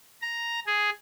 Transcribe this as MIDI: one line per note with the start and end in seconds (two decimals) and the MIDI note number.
0.22 0.59 82
0.66 0.90 68